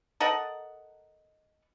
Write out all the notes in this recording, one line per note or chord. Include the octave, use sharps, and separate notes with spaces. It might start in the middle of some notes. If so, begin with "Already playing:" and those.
A4 A#4 D#5 F#5